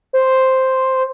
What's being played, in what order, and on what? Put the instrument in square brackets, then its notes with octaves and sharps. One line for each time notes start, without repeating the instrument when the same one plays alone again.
[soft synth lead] C5